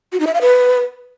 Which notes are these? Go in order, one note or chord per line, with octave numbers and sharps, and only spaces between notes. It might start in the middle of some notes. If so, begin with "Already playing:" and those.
F#4
D#4
E5
F5
B4